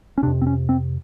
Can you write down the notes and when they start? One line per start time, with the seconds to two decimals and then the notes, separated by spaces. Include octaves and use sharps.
0.18 C#4
0.23 C3 D4
0.27 F2
0.42 C4
0.47 C#4
0.69 C4